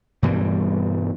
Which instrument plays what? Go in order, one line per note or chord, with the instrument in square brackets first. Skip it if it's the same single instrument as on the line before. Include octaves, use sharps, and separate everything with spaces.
[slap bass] G2 B2 E3 G3